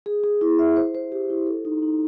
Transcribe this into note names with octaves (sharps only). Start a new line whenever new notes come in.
G#4
G#4
E4
E5
C5
C5
G4
E4
A4
D#4
D#4